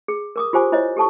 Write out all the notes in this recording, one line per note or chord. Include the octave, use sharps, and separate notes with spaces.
G#4
A#4 D6 D#6
F4 G4 C5 G#5 D6
E4 C5 C#5 D#5
G4 A4 A5 C#6